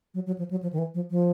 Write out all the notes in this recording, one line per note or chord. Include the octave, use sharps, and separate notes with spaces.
F#3
F#3
F3
F#3
F3
D#3
E3
F3
F3